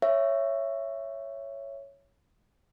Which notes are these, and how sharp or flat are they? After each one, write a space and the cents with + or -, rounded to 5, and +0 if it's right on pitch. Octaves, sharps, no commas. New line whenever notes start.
C#5 +0 E5 +15